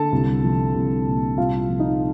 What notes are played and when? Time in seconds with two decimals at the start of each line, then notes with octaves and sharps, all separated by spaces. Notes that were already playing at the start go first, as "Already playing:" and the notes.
Already playing: D3 A4 A5
0.12 C2
0.43 F3
0.75 C2
1.06 A#2
1.37 C2 F4 F5
1.69 F3
1.79 D#4 D#5